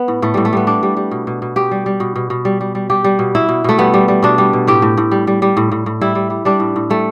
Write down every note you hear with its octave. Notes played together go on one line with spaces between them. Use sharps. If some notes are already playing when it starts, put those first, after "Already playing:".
Already playing: B3
A2
A2 A3
A2 G3
A3
G3 B3
G3 D4
G3
G3
B2
B2
B2
B2 G4
G3
G3
B2
B2
B2
G3
G3
G3
G3 G4
G3
B2
B2 E4
B2
B2 A3
G3 B3
G3
G3
B2 D4
G3
B2
A2 G4
A2
A2
G3
G3
G3
A2
A2
A2
G3 E4
G3
G3
G3 D4
A2
A2
G3 A3